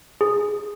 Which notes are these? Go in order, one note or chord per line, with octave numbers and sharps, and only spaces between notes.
G#4